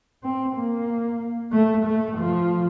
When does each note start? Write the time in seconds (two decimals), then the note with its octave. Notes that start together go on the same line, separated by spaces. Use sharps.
0.23 C4
0.56 A#3
1.52 A3
1.85 A3
2.18 F3